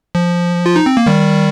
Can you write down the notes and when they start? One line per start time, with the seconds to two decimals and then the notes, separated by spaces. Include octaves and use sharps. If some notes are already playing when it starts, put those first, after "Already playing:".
0.15 F3
0.66 F4
0.76 D#4
0.86 C4
0.97 A#3
1.06 D#3 G3